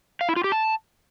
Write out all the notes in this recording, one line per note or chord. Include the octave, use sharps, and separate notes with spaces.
F5
E4
F4
G4
A5